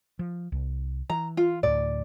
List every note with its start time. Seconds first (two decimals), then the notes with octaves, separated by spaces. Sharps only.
0.19 F3
0.52 C2
1.10 E3 A#5
1.37 F4
1.63 D2 A2 D5